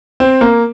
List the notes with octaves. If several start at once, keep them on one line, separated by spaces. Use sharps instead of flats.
C4
A#3